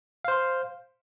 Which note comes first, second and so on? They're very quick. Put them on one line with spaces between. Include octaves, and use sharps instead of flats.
F5 C5 C6